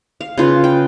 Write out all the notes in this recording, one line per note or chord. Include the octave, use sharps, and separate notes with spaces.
F5
C#3 F4 B4
G5